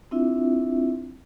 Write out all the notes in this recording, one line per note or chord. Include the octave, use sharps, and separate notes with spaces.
C4 D4 E4 F4 E5